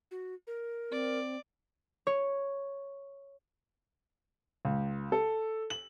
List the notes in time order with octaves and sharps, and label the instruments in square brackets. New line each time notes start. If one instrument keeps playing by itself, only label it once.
[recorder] F#4
A#4
[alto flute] C4 [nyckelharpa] D5
[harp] C#5
[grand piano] C#2
A4
F#7